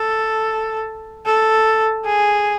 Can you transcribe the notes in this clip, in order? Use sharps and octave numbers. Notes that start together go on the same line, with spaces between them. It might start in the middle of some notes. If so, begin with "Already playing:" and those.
Already playing: A4
A4
G#4